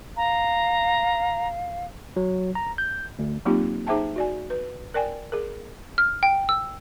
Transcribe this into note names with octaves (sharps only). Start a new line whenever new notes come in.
F5 A#5
F#3
A#5
G6
D2
F#3 A#3 C4 D#4 F4 G4
D#4 G#4 C5 E5 G5 A5
F#4 D5 G#5
B4
A#4 D5 G5 G#5
G#4 A#4
F6
G5
E6